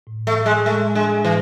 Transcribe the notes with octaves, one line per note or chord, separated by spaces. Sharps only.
A2
A3
A2
G#3
G#3 A3
G#3 D4
A2 E3